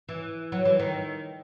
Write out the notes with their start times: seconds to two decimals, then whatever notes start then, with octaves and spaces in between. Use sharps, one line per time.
0.09 E3
0.52 F#3
0.65 E3
0.79 D#3